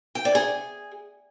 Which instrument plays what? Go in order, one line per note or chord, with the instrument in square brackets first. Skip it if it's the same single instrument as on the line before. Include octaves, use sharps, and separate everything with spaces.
[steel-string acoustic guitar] G5
D5
G#4